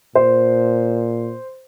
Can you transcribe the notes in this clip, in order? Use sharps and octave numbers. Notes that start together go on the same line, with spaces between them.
A#2 C5